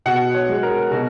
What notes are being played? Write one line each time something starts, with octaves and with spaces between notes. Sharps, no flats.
B2 F#5
C#5
G#3
A#4
B2 F#4